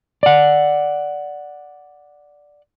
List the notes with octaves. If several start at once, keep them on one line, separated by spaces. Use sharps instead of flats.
D5 F#5